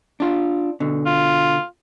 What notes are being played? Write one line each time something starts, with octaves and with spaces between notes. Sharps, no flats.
D4 F4
B2 D3
F4